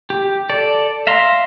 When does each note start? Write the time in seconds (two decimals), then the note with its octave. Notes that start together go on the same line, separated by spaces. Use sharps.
0.10 G4
0.49 A4 D5
1.07 E5 F5 A#5 C6